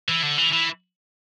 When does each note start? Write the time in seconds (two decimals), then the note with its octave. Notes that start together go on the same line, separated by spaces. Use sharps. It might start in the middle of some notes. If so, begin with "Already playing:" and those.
0.09 E3
0.23 D3
0.38 E3
0.52 E3